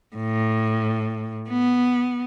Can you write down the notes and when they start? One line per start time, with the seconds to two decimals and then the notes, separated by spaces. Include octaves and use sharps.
0.16 A2
1.49 B3